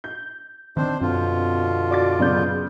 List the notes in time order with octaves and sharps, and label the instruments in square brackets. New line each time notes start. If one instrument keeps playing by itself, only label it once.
[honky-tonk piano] G6
[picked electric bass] D#3 C4 [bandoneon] D4 C5
[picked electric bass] F#2 [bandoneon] B2 D3 F4 [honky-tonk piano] C4
[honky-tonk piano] F#4 D6 A6 [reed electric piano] D5
[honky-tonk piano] C#3 B3 [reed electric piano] F#3 D5 G6